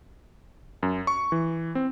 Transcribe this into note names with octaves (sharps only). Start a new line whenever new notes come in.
F#2
C#6
E3
C4